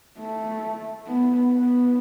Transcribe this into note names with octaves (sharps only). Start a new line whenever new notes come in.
A3
B3
B3